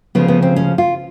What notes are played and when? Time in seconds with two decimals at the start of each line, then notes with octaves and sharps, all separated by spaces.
0.15 D2 C#3 F3 G#3 B3
0.28 B3
0.42 C4
0.56 C#4
0.78 F4